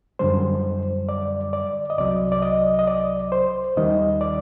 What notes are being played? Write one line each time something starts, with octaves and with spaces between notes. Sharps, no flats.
F#2 D3 G3 C5
D5
D5
D#5
C2 C3 F#3 D5
D5
D#5
D#5
D5
C5
D#2 D#3 G3 D#5
D5